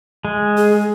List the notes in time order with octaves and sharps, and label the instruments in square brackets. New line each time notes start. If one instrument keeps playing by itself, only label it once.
[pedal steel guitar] G#3
[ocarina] G#4